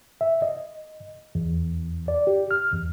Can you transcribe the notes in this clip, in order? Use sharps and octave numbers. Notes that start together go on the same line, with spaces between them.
E5
D#5
E2
D5
G4
F6
E2